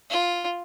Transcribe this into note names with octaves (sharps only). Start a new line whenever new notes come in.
F4